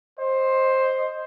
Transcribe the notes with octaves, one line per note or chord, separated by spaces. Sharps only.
C5 D#5